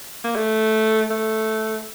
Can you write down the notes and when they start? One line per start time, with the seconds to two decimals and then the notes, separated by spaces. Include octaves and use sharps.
0.24 A#3
0.35 A3
1.10 A3